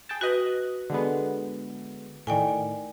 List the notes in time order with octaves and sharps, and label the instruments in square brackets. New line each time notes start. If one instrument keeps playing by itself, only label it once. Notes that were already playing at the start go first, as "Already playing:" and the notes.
[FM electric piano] G#4 G5 A5
[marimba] F#4 B4 [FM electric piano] D#5 F#6
[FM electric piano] D3 G#3 B3
[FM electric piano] A2 D#3 [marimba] D5 G5 G#5